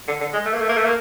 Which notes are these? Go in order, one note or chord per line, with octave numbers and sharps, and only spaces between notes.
D3
D3
G#3
A3
A#3
A3
A#3
A3
A#3